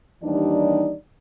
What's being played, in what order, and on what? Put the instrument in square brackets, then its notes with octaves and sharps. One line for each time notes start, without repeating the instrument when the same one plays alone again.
[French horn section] D#2 E3 G3 D4 D#4 D5